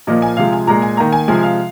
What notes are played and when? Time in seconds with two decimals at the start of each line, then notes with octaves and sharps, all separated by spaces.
0.07 A#2 F3 A#3 D#5
0.22 G#5
0.37 C3 F3 G#3 F5
0.53 G#5
0.67 A#2 G#3 A#5
0.82 G#5
0.97 D#3 A#3 A#5
1.13 G#5
1.28 C3 F3 G#3 G#5
1.43 F5